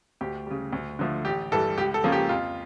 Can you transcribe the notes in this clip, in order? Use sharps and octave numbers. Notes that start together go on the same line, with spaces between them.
D2 G4
C#3 G3
D2
D3 F3 A3
A1 G4
G2 E3 G3 A4
C#2 G4
A4
C#3 F3 A#3 C#4
G4
F2 F4